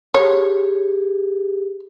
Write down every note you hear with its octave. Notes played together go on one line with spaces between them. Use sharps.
G4 G#4 C#5